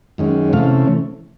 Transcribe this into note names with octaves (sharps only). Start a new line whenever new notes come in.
F#2 D#3 G#3 C#4
C3 E3 A3 C#4 F5